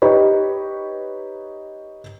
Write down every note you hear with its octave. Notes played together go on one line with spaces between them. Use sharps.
D#4 G4 B4 C#5